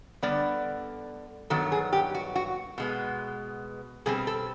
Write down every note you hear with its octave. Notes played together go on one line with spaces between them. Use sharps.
D3 G3 B3 D5
G2 D#3 F#3 B3 A4
G#4
G4
F#4
F#4
B2 G#3 B3
B2 G3 C4 G#4
A4